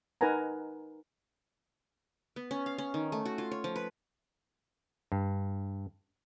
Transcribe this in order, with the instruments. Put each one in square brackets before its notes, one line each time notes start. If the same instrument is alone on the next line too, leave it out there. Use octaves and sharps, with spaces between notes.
[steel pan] D#4 A#4 B4 F#5 G#5 A#5
[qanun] B3
C#4
F5
C#4
D#3
A3
F#4
F4
C#5
F3
B4
[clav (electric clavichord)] G2